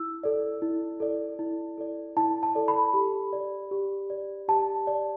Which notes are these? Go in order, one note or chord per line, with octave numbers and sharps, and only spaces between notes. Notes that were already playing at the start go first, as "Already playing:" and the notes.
Already playing: E4 E6
A4 D5
E4
A4 D5
E4
A4 D5
E4 A5
A5
A4 D5
B5
G4
D5
G4
D5
G4 A5
D5